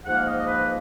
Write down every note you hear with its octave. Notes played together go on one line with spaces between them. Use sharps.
G#2 F3 A#3 F#5
F5
D#5
D#5
B4